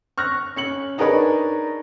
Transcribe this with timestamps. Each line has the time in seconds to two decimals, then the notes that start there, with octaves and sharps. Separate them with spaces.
0.18 C#6 F6 F#6 A#6
0.56 C#4 C#7 F#7
0.98 D4 D#4 G#4 A#4 B4 C#5